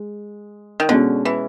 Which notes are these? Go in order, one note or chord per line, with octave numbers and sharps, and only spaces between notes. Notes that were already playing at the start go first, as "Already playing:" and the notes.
Already playing: G#3
D#3
B2 D3 G#3 C#4
E3